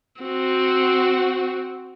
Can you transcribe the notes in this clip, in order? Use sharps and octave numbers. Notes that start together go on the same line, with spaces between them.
C4 F#4